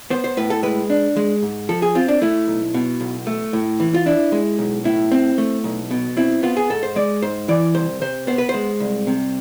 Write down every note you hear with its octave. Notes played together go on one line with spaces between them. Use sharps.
B3 C5
C5
A2 B4
A4
G#3 B4
D4
G#3
G#2
F3 A4
G#4
C4 F4
D4
A3 E4
B1
B2
B1
A3
A2
E3
F4
D4 E4
G#3
B1
A2 E4
C4
A3
B1
B2
C4 E4
B3 F4
G#4
G#2 A4
C5
G#3 D5
G#2 C5
E3 D5
C2 C5
C3 C5
B3 C5
B4
C5
G#3
C2
C3